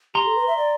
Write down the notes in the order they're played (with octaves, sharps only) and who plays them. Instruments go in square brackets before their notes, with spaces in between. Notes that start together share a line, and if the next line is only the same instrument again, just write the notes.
[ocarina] G4 [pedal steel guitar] A#5 C6
[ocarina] A4
B4
E5
D5